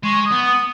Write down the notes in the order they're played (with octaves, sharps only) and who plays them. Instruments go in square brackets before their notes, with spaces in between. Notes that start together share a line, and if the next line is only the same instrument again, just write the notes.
[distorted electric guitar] G#3 [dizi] C#6
[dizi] D#6
[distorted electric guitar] B3
[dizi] D#6